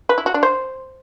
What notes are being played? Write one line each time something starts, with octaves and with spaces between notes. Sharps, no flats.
B4
E4
F#4
D4
C5